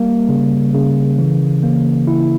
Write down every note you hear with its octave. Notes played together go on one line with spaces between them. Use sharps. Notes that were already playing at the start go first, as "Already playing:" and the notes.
Already playing: G3 A#3
C#3
C#3
E3
A#3
E4